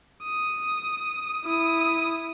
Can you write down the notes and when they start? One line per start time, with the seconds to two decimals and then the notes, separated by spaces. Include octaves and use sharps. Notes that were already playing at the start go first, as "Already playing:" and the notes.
0.23 D#6
1.44 E4 D#6